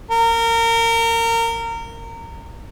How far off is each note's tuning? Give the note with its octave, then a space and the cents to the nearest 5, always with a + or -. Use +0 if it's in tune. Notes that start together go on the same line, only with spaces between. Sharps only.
A#4 -25